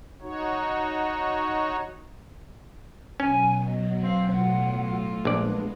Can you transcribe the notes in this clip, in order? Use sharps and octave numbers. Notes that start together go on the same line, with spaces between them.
D#4 F#4 C#5
B2 F#3 C#4 G#5
D#5
C4 F5
A2 F4 F#5
A#1 G#3 B3 D4 B4 D5